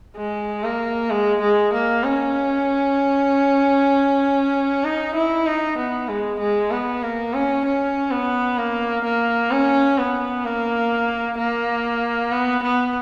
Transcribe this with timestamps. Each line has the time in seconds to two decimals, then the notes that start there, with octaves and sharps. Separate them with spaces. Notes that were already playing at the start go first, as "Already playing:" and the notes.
0.17 G#3
0.64 A#3
1.10 G#3
1.41 G#3
1.73 A#3
2.03 C#4
4.84 D#4
5.15 E4
5.46 D#4
5.77 B3
6.09 G#3
6.39 G#3
6.71 B3
7.02 A#3
7.34 C#4
7.64 C#4
8.11 B3
8.58 A#3
9.04 A#3
9.52 C#4
9.98 B3
10.45 A#3
11.38 A#3
12.31 B3
12.63 B3